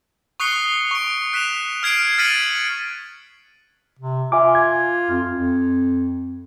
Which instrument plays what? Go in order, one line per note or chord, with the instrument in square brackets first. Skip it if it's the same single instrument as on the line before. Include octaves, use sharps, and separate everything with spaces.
[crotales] C#6 D#6 F#6 C7 C#7 G7
C#6 D7
F#6 B6 E7 F7
F6 G#6 C7 D7 D#7
F6 A6 B6 C#7 D#7 F#7
[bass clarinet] C3
[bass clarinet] F4 [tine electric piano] E5 G#5 D6
[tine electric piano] G#6
[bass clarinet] F2
F2